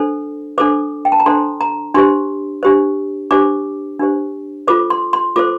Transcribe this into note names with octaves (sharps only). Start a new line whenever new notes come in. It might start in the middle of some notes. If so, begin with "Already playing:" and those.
Already playing: D4 A4 C5
D4 A4 C5 D6
G5
A5
A#5
D4 A4 C5 C6
A#5
D4 G4 C5 C6
D4 G4 C5
D4 G4 C5 D6
D4 G4 C5
F4 A4 C5 D6
C6
C6
F4 A4 C5 D6